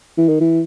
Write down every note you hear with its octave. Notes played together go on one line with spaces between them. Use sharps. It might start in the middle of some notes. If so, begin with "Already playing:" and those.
E3
D#3
E3